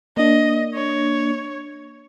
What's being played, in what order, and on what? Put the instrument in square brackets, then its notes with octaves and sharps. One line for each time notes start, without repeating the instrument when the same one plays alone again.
[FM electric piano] A#3 D4 [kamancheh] D#5
[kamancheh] C#5